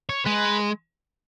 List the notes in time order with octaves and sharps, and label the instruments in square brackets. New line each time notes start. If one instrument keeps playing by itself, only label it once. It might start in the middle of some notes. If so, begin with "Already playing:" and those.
[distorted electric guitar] C#5
[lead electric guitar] G#3 [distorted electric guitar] B4